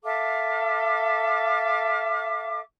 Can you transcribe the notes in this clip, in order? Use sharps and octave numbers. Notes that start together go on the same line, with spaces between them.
A4 E5 F5 D6